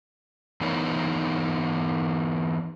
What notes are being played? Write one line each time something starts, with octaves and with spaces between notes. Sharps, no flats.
E3 B3 D#4 A#4 C#5